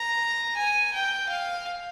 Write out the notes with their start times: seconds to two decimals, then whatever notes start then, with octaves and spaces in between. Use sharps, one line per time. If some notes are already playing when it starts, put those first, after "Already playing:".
Already playing: A#5
0.57 G#5
0.93 G5
1.29 F5